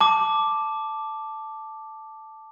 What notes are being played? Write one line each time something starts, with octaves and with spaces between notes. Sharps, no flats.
A5 D6